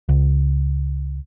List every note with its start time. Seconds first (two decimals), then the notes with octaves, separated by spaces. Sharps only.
0.09 C#2